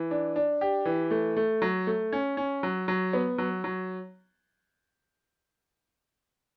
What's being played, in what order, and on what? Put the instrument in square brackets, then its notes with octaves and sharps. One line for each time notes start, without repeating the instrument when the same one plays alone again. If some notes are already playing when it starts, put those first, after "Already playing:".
Already playing: [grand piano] E3
D4
D4
G4
E3
A3
A3
F#3
A3
C#4
C#4
F#3
F#3
B3
F#3
F#3